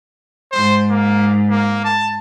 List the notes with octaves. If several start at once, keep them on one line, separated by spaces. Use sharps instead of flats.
G#2 C5
A#3
A#3
A5